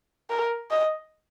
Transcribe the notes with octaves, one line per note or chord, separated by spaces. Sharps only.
A#4
D#5